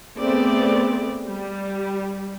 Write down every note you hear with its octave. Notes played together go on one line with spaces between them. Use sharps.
A3 B3 C4 G#4 D5
G3